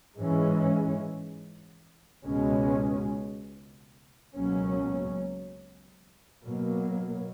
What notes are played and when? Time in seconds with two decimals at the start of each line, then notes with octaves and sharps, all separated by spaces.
0.16 G#2 E3 G#3 C#4
2.25 C#2 B2 G#3 C#4
4.34 C#2 B2 F#3 A#3 C#4
6.43 B2 F#3 A#3